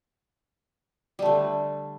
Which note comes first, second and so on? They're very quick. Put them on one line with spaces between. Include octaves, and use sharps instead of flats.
G3 A3 D3